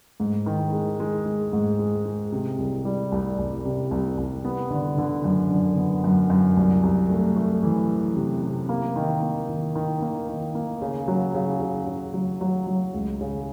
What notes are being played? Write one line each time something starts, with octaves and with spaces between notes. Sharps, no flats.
G#2
D#3
G#3
G#3
G#3
G#2
G#3
G#3
C3
C2
G3
C2
C2
C3
C2
C2
B3
D3
D3
F#2
D3
B3
F#2
F#2
C2
C2
A3
A3
E3
E3
C3
C3
A#3
D#3
A#3
D#3
D#3
A#3
D#3
A#3
C#3
F#3
C#3
C#3
C#3
F#3
F#3
F#3
C#2
C#3